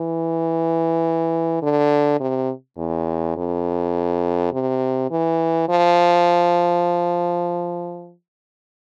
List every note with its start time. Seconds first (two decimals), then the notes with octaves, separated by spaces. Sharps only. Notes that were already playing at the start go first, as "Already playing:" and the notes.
Already playing: E3
1.62 D3
2.20 C3
2.78 E2
3.36 F2
4.52 C3
5.11 E3
5.69 F3